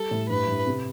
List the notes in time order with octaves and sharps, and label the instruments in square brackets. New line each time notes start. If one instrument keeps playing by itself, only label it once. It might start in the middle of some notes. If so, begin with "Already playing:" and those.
Already playing: [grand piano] G3 [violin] A4
[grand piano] A2
[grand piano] G2 [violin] B4
[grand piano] G2
C3